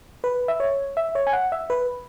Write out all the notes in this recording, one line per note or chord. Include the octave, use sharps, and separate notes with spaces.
B4
E5
C#5
E5
C#5
G#5
F#5
E5
B4